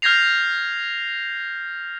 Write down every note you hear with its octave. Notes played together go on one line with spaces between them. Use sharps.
F6 G6 G#6 A#6 C7 F7